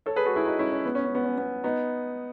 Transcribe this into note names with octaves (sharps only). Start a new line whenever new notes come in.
A4 C#5
G#4 B4
F#4 A4
E4 G#4
D#4 F#4
C#4 E4
C#4
B3
C#4
C#4
B3
C#4
B3
B3 D#4